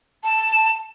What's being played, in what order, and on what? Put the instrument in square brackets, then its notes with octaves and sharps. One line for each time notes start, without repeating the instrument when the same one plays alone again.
[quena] A5